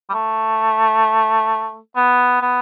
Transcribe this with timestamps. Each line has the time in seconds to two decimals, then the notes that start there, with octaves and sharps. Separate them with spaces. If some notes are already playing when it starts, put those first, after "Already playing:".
0.09 G3
0.14 A3
1.96 B3
2.41 B3